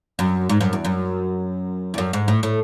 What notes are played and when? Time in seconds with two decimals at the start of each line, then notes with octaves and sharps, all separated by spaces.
0.19 F#2
0.49 G#2
0.61 F#2
0.73 E2
0.85 F#2
1.94 E2
1.98 F#2
2.13 G#2
2.28 A2
2.43 A2